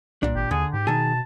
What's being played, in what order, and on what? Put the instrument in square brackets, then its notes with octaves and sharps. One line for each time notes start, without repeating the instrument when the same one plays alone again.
[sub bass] C2 [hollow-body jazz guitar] A#2 D4
[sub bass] G#1 [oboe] G4
[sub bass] D#2 [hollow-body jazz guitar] D3 [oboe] G#4
[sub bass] G#2 [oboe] G4
[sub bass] B2 [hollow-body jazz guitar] D#3 G#4 [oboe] A5